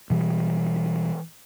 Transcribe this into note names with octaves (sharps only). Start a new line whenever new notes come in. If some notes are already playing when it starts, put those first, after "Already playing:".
B2 E3 G3